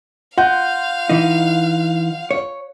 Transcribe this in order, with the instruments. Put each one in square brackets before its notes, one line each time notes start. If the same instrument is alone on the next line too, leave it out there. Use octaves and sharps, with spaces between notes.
[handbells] F4 G6 [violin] F5 [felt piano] F#5
[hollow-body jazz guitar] E3 D#4
C#5